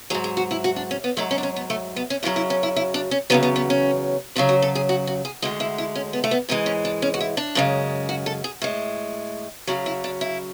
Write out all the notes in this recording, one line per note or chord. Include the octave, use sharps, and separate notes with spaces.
G#2 F#3 G#4
G#4
F#4
E4
F#4
D4
C#4
B3
G#2 F#3 A3
C#4
D4
C#4
B3
A3
B3
C#4
F#2 C#3 F#3 E4
E4
C#4
E4
E4
D4
C#4
E2 C#3 F#3 B3
B3
B3
C#4
F#2 C#3 F#3 D4
F#4
A4
G#4
F#4
F#4
G#4
D2 D3 G#3 F#4
E4
E4
C#4
B3
A3
B3
G#2 E3 G#3 B3
C#4
D4
C#4
F#4
E4
D4
F#2 C#3 G#3
F#4
A4
G#4
A2 G#3
F#2 C#3 F#3 F#4
E4
D4
E4